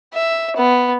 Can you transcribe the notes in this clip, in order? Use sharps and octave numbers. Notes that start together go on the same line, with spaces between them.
E5
B3